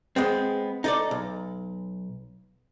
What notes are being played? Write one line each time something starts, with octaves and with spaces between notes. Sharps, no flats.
G#3 B3 C4
D#4 A4 D5
B1